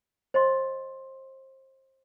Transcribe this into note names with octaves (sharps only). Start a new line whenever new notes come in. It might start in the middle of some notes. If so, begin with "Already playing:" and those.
C5 D#5 C6